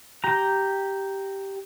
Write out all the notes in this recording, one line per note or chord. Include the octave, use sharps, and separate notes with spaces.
G4 A#5